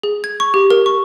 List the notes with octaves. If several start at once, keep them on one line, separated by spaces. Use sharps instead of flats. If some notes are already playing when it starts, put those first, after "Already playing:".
G#4
G#6
C#6
G4
A#4
C#6